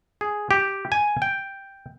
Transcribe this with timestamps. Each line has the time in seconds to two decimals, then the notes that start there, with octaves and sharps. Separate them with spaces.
0.21 G#4
0.51 G4
0.92 G#5
1.22 G5